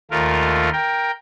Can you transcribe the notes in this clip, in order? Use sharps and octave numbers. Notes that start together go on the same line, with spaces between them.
D#2 A3 F4 A#4
A#4 G5